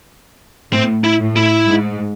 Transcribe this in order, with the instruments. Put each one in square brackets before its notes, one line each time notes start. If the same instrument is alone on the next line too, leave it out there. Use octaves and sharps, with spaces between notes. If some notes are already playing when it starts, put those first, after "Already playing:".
[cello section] A2 [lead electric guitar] C4
[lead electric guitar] E4
[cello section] A2
[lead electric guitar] E4
[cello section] G#2